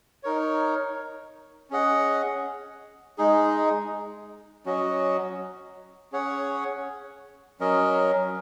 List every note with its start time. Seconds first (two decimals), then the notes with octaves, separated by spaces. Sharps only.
0.23 D#4 A#4 C#5
1.70 C#4 G#4 D#5 F#5
3.18 G#3 D#4 G#4
4.66 F#3 C#4 F#4 D#5
6.12 C#4 G#4 C#5 F#5
7.60 F#3 C#4 A#4 D#5